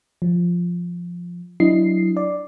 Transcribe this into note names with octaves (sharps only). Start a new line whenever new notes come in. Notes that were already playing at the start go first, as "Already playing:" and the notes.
F3
F#3 D4 E4 D#5 C7
D5